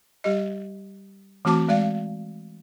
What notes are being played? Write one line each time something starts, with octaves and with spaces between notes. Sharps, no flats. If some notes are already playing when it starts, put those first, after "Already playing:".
G3 G4 D#5
E3 A3 C4 F#4 A5 D6
G#3 D5 F5